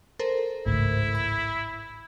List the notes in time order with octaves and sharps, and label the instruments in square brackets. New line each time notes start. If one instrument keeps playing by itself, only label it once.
[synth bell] A4 A#4 C5
[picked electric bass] G#1 C#2 A2 [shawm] E4
[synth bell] B5